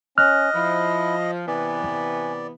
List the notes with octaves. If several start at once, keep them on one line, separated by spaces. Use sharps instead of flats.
C#4 D#5 F6 F#6
F3 E4
C3 E3 B3 D5 G#5